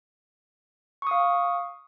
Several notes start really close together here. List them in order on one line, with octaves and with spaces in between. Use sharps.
C#6 D#6 F5